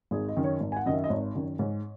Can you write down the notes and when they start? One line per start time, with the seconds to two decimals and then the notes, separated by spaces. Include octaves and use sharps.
0.11 G#1 G#4
0.28 D#5
0.37 F#2 D#3
0.44 C#5
0.61 G#1
0.72 G#5
0.76 F#5
0.86 F#2 D#3 D#5
0.94 E5
1.04 D#5
1.09 G#1 C#5
1.35 F#2 D#3
1.59 G#2 C#5